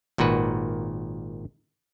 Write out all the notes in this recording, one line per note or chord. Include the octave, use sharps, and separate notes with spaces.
G#1 A#2 D#3 F#4 B4